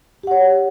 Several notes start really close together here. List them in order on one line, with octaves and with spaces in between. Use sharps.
G4 F#5 C#5